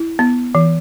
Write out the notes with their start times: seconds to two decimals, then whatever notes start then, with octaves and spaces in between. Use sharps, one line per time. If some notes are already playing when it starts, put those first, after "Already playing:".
Already playing: E4
0.19 B3
0.55 E3